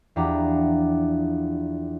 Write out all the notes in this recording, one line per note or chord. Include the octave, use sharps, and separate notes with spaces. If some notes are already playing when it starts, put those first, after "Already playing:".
E2 F3 D4 G4 A#5